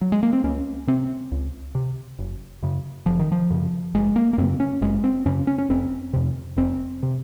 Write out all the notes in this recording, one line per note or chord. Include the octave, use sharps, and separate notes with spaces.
F#3
G#3
A#3
C4
C#2 C#4
C3 C4
C#2
C3
F#1
F#2 C#3
F#1 F3
D#3
F3
F#2 C#3
F#1 G#3
A#3
A#3
F#2 C#3 C4
C#4
F#1 G#3
C4
F#2 C#3 C#4
C#4
C#4
F1 C4
F2 C3
F1 C4
C3